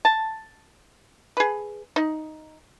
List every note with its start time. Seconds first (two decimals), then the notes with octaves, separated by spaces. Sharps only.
0.05 A5
1.37 G#4 B4
1.96 D#4